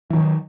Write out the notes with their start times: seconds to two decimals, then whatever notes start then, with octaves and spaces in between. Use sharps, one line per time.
0.10 E3
0.13 F#3
0.16 D#3